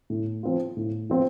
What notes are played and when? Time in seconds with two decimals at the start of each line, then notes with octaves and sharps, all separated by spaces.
0.10 A2
0.43 F3 C4 F4
0.77 A2
1.10 F3 C4 F4